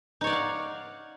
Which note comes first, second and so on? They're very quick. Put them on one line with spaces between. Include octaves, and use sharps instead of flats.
D#4 C#5 D5 F#5 F5